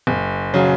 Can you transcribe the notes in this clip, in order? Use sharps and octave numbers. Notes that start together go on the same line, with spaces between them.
F#1
C#3 F#3